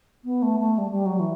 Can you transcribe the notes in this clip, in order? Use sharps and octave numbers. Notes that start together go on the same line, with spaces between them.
B3
A3
A3
G3
G3
F#3
E3